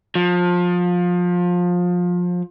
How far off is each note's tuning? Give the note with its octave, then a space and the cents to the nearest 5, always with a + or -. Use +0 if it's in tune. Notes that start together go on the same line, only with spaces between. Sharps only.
F3 +25